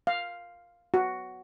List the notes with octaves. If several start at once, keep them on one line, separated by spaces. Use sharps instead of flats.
F5
F#4